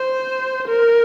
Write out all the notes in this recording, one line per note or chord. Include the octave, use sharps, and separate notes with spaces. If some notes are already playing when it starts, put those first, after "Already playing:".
Already playing: C5
A#4